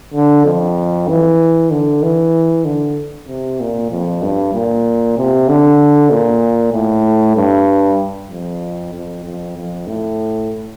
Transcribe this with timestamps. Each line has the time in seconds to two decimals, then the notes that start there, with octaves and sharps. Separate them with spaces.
0.14 D3
0.46 F2
1.08 E3
1.71 D3
2.02 E3
2.65 D3
3.28 C3
3.60 A#2
3.91 F2
4.22 G2
4.54 A#2
5.17 C3
5.48 D3
6.11 A#2
6.73 A2
7.36 G2
8.30 F2
8.93 F2
9.25 F2
9.57 F2
9.87 A2